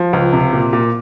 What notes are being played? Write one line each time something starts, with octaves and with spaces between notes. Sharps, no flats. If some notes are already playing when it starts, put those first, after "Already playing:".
Already playing: F3
C#2
C3
A#2
A#2